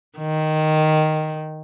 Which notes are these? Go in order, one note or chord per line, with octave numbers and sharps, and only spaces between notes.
D#3